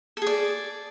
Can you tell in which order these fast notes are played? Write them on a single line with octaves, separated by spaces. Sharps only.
A4 G#4 D5